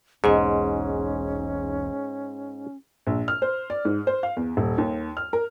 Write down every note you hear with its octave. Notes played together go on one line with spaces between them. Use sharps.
E1 B1 E2 G#2 C#4 G#4 D#5 C6
A#1
F6
C5
D5
G#2
C5
F5
E2
D#1
D#2
F6
A#4